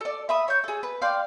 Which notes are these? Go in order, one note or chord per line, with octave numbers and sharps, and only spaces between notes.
A4 D5
E5 B5 D#6
C#5 G6
G#4 A4
B4
D5 F5 G5 C6